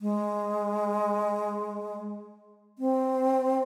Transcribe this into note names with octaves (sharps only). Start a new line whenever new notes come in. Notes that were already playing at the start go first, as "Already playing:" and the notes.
G#3
C4